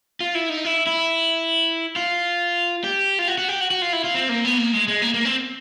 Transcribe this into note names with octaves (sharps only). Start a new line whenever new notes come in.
F4
E4
D#4
E4
E4
F4
G4
F4
F#4
F#4
G4
F#4
F#4
F4
E4
F4
C4
A#3
B3
A#3
G#3
G#3
A#3
A#3
C4